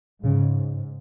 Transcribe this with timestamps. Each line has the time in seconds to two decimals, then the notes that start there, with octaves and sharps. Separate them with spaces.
0.23 G#2 C#3